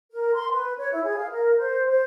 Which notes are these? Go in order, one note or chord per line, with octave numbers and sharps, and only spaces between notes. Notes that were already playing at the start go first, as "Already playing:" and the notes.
A#4
C6
B4
C#5
E4
G#4
F5
A#4
C5
C5